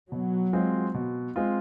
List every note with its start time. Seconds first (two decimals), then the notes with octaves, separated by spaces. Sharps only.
0.11 B2 F#3
0.53 G#3 C4 F4
0.94 B2
1.36 G#3 C4 F4